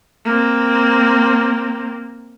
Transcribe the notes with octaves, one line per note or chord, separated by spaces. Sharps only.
A#3 C4